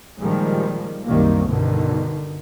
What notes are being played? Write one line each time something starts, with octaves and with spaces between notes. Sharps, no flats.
A#2 D#3 F3 G3 G#3
C2 F#2 D#3 G3 A#3
G2 B2 D3 D#3